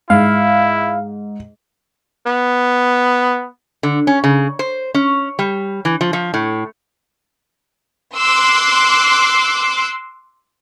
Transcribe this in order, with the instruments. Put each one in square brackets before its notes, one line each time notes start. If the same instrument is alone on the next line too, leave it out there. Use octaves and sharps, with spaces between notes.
[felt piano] G#2 [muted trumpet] E4 [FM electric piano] F5
[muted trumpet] B3
[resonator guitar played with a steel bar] D3
C#4
C#3
C5
C#4
G3
E3
F3
F3
A2
[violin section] C6 D6 E6 F#6